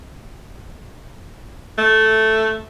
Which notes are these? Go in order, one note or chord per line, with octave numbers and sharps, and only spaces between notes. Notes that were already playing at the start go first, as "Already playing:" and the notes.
A3